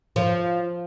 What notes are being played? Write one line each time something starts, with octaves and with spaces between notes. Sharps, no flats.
F3